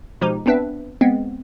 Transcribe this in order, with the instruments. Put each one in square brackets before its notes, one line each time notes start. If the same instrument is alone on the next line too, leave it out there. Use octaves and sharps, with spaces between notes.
[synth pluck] B2 F3 G#3 D#4 G4
B3 C4 D4 B4 E5
G#3 B3 C4